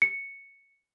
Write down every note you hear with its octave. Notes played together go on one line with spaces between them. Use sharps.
C#7